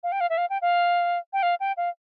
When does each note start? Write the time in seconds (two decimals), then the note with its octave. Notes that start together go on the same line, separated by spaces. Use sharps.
0.03 F5
0.12 G5
0.21 F5
0.30 E5
0.38 F5
0.50 G5
0.62 F5
1.33 G5
1.43 F5
1.60 G5
1.77 F5